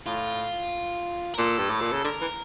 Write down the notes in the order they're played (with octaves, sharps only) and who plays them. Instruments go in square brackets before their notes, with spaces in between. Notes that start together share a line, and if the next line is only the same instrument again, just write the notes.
[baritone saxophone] A2 [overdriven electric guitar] F4
[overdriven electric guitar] A#4
[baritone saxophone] A#2 [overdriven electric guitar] A4
[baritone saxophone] G2
A2
A#2
C#3
[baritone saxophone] D3 [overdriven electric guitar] A#4
[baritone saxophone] E3